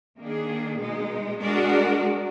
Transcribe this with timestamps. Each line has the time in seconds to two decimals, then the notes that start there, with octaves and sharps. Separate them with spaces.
0.19 D#3 A#3 D4 G#4
0.80 B2 G#3 D#4
1.41 G#3 D4 F#4 A#4 D5